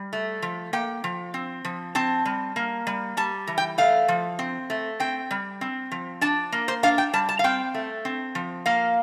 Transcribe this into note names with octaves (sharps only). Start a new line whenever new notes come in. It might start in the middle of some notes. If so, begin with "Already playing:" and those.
Already playing: G3
A3
F3
A#3 G5
F3
C4
F3
C4 A5
G3
A#3
G3
G3 A5
E3
G5
A3 F5
F3
C4
A3
C4 G5
G3
C4
F3
D4 A5
A#3
C5
D4 F5
G5
G3 A5
A5
F5
C4 G5
A3
C4
F3
A#3 F5